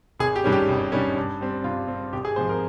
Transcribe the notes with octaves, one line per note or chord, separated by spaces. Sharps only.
G#1 G#4
G4
G2 D#3 G3 C#4
G4
G#1
G2 D#3 G3 C#4
G2
G3 C4
G2 F4
G3 C4
G#1 G4
G#4
G#2 F3 C4 C5
A#4